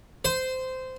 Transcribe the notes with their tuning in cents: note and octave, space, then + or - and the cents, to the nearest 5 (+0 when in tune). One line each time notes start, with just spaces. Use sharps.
C5 -15